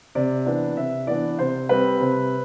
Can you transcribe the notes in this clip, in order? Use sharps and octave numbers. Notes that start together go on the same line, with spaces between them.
C3 D5
E3 B3 D4
C3 E5
E3 B3 D4 D5
C3 C5
G3 C4 B4
C3